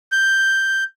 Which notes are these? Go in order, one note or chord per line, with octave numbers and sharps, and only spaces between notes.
G6